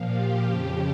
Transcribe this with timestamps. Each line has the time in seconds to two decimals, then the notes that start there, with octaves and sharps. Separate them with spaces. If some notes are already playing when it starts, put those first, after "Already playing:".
Already playing: A#2 F3 F4
0.08 G4
0.42 F2 C#3 F3